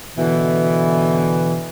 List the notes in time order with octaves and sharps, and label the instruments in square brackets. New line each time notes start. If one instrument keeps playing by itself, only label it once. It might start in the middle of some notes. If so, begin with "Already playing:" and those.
[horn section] B2 D3 E3